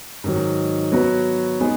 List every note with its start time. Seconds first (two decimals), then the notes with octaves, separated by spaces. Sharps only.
0.24 G#2 D#3 F#3
0.92 F#3 B3 F#4 B4
1.60 G#3 B3 D#4 G#4